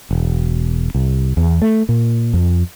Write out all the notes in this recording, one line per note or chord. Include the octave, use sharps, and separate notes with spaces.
E1
C2
E2
A3
A#2
F2